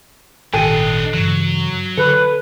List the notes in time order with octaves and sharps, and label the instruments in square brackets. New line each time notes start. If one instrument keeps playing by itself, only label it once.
[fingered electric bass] G#1 A#2 D#3 [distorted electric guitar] D4 D#5 [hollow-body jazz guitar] A4 G5 G#5
[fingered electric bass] G2 C#3 E3 [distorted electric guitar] F#3
[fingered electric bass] D3 [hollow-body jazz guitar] A4 [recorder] B4